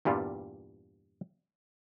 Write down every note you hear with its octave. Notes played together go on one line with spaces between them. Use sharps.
E2 G2 A#2 G3 F4